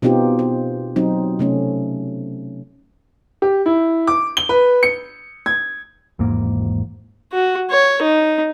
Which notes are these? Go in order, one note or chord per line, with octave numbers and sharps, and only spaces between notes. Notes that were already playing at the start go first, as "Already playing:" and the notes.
B2 B3 C4 D#4 F4 G4
C5
F#3 C4 D#4
C3 A3 C#4
G4
E4
D6
G7
B4
C#7
G#6
G#1 E2 G#2 A#3
F#4
C#5
D#4